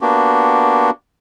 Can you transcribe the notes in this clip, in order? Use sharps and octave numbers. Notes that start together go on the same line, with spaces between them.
A#3 B3 D4 F#4 G4